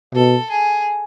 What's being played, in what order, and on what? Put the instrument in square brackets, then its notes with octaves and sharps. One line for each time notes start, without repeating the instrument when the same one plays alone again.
[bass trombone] B2 [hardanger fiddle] A4
[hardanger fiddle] G#4